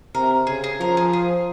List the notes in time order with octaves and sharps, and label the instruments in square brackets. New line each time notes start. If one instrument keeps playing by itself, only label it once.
[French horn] C3 [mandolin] A#4
[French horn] C#3 [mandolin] G#4
[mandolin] G#4
[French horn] F3 [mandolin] A#4
[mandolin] G#4
G#4